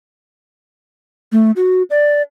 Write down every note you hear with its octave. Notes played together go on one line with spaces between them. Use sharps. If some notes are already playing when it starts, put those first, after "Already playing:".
A3
F#4
D5